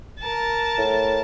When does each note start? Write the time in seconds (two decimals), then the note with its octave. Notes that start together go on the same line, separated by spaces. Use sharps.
0.19 A#4 A5
0.78 A2